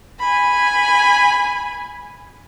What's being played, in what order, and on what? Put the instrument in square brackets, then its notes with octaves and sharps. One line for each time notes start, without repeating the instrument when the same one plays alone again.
[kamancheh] G#5 B5